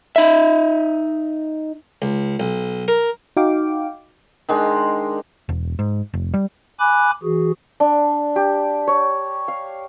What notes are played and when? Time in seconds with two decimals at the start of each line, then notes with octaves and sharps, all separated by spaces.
0.16 D#4 E5
2.02 C#2
2.40 B1
2.88 A#4
3.36 D#4 F#4 F5 G5 D6
4.49 D#3 G#3 D4
5.49 E1
5.79 G#2
6.14 F1
6.34 G3
6.79 G#5 B5 D6 F#6
7.23 E3 F#4 G#4
7.80 D4
8.36 G4
8.87 C#5
9.48 F5